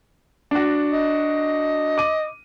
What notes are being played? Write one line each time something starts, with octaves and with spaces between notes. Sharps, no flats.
D4 F#4
D#5
D6 D#7